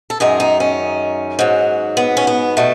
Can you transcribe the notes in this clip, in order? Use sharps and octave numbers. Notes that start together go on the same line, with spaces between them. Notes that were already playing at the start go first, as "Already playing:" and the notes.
A4
F#2 D#3 G#3 G#4
D#4
C#4
G#2 F#3
B3
C#4
B3
B2 A3